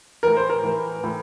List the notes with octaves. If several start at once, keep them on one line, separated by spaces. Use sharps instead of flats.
A2 E3 A#4
C5
A#4
A2 E3
A2 E3